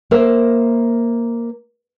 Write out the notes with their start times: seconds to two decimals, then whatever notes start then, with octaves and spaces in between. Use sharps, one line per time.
0.11 A#3 A#4 C5 E5